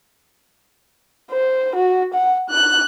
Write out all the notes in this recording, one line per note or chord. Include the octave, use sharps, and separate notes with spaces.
C5
F#4
F#5
F#6